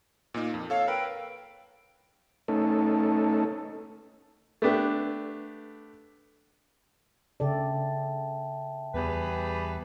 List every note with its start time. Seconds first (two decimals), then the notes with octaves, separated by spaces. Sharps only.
0.34 A#2 A#3 D#4
0.54 F2
0.70 A4 C#5 F5 E6
0.88 A#4 B4 G5
2.48 A3 C#4 D#4 A4
4.62 A3 B3 D4 G4
7.40 C#3 A4 D5 E5 G5 A5
8.94 E2 G3 G#4 B4